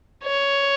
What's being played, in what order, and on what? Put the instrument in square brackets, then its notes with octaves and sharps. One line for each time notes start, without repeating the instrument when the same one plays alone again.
[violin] C#5